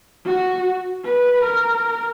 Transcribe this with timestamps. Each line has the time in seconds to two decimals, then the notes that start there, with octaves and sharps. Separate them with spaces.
0.25 F#4
1.04 B4
1.43 A#4